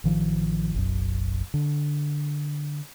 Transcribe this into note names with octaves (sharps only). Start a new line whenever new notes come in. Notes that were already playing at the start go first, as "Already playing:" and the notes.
A1 D#3 F3
F#1 B1 F#2
D3